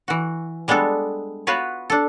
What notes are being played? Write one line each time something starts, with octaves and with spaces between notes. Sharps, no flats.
E3 F#4
G3 G#3 B3 D4 A4
B3 F4 F#4 B4 C#5
D4 A4